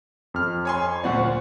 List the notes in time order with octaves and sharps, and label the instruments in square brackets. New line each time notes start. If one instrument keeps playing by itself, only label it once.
[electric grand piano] F2 F6
[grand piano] C#5 G#5 C6
[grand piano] D2 A#2 D5 [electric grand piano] C5 F#5 C#6